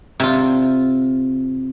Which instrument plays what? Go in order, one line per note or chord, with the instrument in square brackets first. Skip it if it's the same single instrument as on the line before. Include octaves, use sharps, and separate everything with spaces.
[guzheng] C3 F4